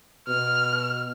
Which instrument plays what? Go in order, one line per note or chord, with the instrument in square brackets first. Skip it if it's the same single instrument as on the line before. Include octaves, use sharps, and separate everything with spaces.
[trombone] B2 [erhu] F6